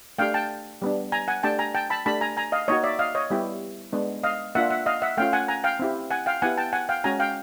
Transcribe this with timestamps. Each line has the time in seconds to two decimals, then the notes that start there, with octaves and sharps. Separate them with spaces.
0.18 A3 D4 G4 F5 G5
0.34 G5 A5
0.82 G3 B3 D4
1.12 G#5 A#5
1.28 F#5 G#5
1.43 A3 D4 G4 G5 A5
1.59 G#5 A#5
1.75 G5 A5
1.90 A5 B5
2.06 A3 D4 G4 A5 B5
2.21 G#5 A#5
2.37 G#5 A#5
2.52 D#5 F5
2.68 A#3 D#4 F#4 C#5 D#5
2.84 D5 E5
2.99 D#5 F5
3.15 C#5 D#5
3.30 G3 B3 E4 G4
3.93 G#3 B3 D4
4.23 D#5 F5
4.55 A#3 D4 F4 E5 F#5
4.71 E5 F#5
4.86 D#5 F5
5.02 E5 F#5
5.17 A3 C#4 F4 F5 G5
5.33 F#5 G#5
5.48 G#5 A#5
5.64 F5 G5
5.79 C4 E4 G4
6.11 F#5 G#5
6.26 F5 G5
6.42 B3 E4 G4 F#5 G#5
6.58 G5 A5
6.73 F#5 G#5
6.89 F5 G5
7.04 G#3 C#4 F#4 G#5 A#5
7.19 F5 G5